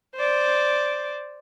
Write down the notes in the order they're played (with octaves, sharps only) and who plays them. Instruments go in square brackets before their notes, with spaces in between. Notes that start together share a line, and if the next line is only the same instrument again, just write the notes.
[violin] C5 D5